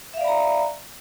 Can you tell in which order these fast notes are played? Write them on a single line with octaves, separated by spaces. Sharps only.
E5 F5 D5 B5 A#5